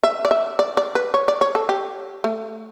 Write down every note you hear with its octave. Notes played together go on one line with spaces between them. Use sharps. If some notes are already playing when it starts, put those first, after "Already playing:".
E5
D5
E5
D5
D5
B4
C#5
D5
C#5
A4
G4
A3